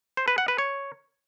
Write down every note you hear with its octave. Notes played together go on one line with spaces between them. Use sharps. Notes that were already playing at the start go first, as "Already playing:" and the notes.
C5
B4
F#5
B4
C#5